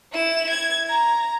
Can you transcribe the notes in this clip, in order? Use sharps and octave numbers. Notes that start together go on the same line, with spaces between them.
E4 E7
G#6
A#5